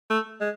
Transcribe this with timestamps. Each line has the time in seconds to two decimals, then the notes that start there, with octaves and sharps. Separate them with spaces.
0.10 A3
0.41 G#3